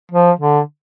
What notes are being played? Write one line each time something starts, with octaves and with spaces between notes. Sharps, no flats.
F3
D3